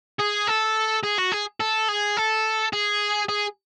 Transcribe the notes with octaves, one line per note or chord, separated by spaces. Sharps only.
G#4
A4
G#4
F#4
G#4
A4
G#4
A4
G#4
G#4